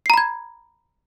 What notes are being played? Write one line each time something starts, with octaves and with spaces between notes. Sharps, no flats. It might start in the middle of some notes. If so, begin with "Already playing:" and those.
A#5 B5 G#6 C7